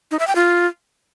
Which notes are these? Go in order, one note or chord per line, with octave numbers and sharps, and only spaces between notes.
D#4
E5
G5
F4